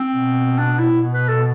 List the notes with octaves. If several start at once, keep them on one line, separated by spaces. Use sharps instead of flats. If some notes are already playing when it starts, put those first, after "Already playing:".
Already playing: C4
B2
D4
E4
B2
B4
A4